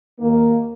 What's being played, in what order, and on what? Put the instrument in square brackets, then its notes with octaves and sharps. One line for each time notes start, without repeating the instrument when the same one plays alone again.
[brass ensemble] D#2 D#3 A#3